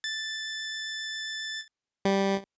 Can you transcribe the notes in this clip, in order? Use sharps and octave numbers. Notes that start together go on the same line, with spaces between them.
A6
G3